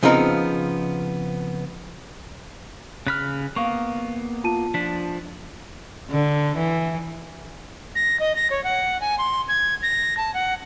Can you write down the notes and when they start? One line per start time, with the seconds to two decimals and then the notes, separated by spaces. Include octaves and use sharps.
0.03 C#3 F3 B3 C4 D#4 A#4
3.07 C#3 B5 F6 F#6
3.56 A#3 B3 F5 C#6
4.44 F4 A5 D#7
4.74 F3 D4 B6
6.10 D3
6.57 E3
7.95 A#6
8.20 D#5
8.36 A#6
8.50 C#5
8.64 F#5
9.01 G#5
9.18 C6
9.48 G#6
9.83 A#6
10.17 A5
10.34 F#5